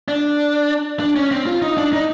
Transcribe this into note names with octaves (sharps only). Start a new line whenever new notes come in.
D4
D4
C#4
C4
F4
D#4
D4
D#4